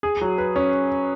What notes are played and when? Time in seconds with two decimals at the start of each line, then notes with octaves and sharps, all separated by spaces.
0.03 G#4
0.21 F#3
0.38 B4
0.56 C#4